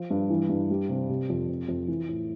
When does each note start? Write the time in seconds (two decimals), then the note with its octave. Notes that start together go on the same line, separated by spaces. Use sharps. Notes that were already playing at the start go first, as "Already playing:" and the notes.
Already playing: F3
0.10 G2
0.30 E3
0.49 G2
0.70 G3
0.89 C3
1.09 C3
1.30 F2
1.49 C3
1.68 F2
1.88 E3
2.09 A2